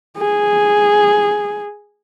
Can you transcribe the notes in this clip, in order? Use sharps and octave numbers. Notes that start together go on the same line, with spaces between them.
G#4